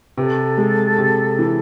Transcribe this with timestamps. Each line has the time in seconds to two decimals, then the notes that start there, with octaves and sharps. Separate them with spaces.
0.17 C3 A4 B4
0.58 G#3
0.98 C3
1.39 E3